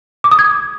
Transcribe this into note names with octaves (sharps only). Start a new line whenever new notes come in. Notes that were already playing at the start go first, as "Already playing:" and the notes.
D6
D#6
G#6